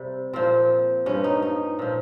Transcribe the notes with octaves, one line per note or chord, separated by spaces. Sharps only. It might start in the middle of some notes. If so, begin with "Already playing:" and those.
Already playing: C3 G3
A#2 F3 C4
G2 F3 C#4
D#4
D#4
A#2 F3